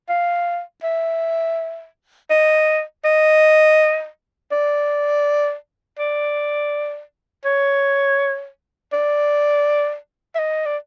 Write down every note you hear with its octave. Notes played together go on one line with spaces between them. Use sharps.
F5
E5
D#5
D#5
D5
D5
C#5
D5
E5
D#5
D5